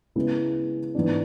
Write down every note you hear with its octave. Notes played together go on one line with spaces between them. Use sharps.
C#3 G#3 B3 E4
G#2 E3 B3 D4